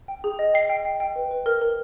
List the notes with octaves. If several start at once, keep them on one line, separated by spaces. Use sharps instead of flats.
G5
G#4
D#5
G5 C7
G5
G5
G5
B4
B4
A#4
A#4